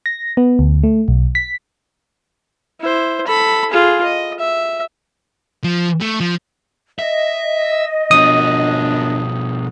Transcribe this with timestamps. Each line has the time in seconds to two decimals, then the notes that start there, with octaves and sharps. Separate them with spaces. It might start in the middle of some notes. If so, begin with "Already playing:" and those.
0.06 A#6
0.37 B3
0.59 D2
0.83 A3
1.08 B1
1.35 B6
2.80 E4 C5
3.27 A4 B5
3.70 F4 G#4
4.03 D#5
4.39 E5
5.64 F3
6.01 A3
6.20 F3
6.99 D#5 E5
8.11 F#2 B2 F3 B3 D4 D#6